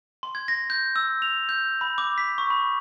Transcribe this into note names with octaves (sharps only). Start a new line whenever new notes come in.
C6
G#6
A#6
G6
E6
F7
G6
B5
D6
B6
C#6
B5